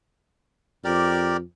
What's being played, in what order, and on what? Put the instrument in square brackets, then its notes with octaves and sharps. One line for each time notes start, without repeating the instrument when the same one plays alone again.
[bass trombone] F2 [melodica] G4 A#4 D5